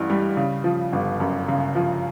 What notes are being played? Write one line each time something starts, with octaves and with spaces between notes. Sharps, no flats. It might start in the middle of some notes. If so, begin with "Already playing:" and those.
Already playing: A1 G2 E3
G3
C#3
F3
G1
F#2
C#3
F3